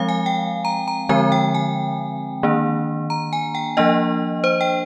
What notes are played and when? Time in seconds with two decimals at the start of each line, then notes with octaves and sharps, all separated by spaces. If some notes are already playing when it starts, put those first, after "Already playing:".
Already playing: F3 G#3 C4 F5
0.09 G#5
0.26 G5
0.65 A#5
0.88 A#5
1.09 D3 F3 G#3 C4 G#5
1.32 G5
1.54 G#5
2.43 D#3 A#3 D4
3.10 A#5
3.33 G#5
3.55 G5
3.77 F3 A#3 D4 D#5
4.44 C5
4.61 G5